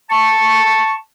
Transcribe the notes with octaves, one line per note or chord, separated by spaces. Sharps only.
A5 C#6